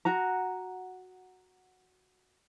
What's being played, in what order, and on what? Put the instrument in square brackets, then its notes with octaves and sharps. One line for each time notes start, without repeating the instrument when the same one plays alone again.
[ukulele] F#4 F#5 A#5